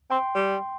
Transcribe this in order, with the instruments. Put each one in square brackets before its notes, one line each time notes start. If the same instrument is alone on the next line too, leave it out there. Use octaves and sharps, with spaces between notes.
[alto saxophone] C4 [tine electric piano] G5 C6
[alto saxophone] G3